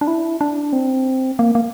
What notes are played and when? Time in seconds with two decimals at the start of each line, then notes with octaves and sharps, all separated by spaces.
0.01 D4
0.07 E4
0.41 D4
0.73 C4
1.39 A#3
1.55 A#3